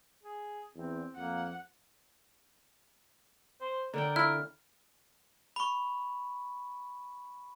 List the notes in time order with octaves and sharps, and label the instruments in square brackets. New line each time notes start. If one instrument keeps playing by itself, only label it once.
[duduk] G#4
[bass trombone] E2 [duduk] C4
[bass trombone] F2 [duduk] A#3 [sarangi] F#5
[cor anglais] C5
[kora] D3 D5 G5 [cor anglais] A#4
[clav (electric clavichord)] E4 F4 [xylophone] F6
[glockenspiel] B5 C#6